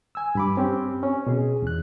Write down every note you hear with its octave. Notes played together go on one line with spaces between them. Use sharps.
G#5 E6
G2 B5 D6
C4 C#4 G4
C#4
B2 G#4
E2 F#6